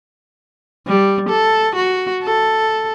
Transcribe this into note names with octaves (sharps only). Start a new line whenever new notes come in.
G3
A4
F#4
A4